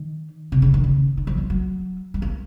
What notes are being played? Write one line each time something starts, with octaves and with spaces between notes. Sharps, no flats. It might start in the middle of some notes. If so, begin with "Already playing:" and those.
Already playing: D#3
C3
C#3
D#3
C#3
D#3
F3
F#3
F#3
G#3
A#3